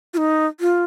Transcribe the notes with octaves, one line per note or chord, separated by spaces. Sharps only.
F4
D#4
F4